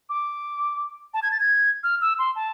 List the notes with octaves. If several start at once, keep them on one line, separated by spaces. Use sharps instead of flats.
D6
A5
G#6
A6
G#6
F6
E6
C6
A5